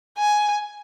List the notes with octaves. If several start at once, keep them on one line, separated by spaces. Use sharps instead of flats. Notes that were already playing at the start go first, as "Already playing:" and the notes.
G#5